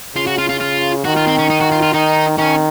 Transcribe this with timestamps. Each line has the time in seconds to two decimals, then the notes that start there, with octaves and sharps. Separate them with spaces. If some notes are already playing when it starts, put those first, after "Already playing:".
0.16 C#3 F4
0.27 F#4
0.39 F4
0.49 F4
0.60 F4
1.05 D#3 F#4
1.16 F4
1.27 C4
1.38 C#4
1.50 D#4
1.61 F#4
1.72 F4
1.83 F4
1.94 D#3 D#4
2.38 D#3 C#4